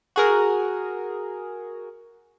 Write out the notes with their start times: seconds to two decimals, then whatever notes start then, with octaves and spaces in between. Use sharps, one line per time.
0.16 F#4 G#4 A#4